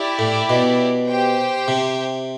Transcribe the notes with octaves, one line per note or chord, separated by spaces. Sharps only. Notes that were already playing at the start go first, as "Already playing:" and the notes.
Already playing: E4 G4 D5
A2
B2
G4 C5 G5
C3